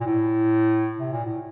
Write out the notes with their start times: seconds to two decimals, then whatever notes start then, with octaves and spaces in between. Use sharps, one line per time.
0.01 A#2
0.06 A2
0.99 C3
1.12 A#2
1.25 A2